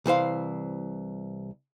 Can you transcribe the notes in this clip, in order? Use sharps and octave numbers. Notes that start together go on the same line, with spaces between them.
C2 E3 C5 F5